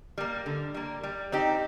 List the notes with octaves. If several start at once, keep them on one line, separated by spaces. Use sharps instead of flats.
G3 A#3
D3
G3 A#3
G3
C4 D#4 G4